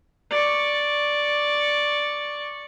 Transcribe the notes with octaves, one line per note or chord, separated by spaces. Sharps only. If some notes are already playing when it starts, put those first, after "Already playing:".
D5 C#6